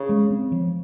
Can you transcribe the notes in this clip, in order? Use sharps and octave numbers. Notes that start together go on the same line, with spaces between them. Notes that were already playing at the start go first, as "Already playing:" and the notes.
Already playing: C#3
G#3
C4
F3